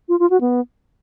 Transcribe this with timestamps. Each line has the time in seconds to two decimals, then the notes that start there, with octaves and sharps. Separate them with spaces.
0.09 F4
0.19 F4
0.30 F#4
0.41 B3